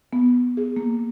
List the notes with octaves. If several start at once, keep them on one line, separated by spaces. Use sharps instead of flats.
B3
G#4
A#3